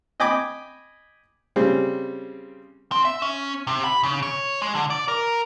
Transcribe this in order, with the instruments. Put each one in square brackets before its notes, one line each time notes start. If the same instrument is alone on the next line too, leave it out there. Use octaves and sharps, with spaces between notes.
[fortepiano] D#5 G5 G#5 B5 D6
C#3 G3 C4
[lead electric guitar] C4
E5
C#4
C3
B5
C#3
C#5
G#3
D3
D5
A#4